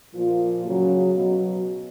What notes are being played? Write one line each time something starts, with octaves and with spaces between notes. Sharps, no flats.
A#2 F3 F4
C#3 F#3 F#4
B2 F#3